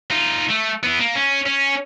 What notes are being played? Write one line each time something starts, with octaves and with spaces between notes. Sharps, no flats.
D#4 F4
A3
B3 E4
A#3
C#4
C#4